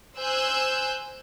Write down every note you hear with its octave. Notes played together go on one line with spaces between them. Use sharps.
C5 G#5 E6 F#6 G6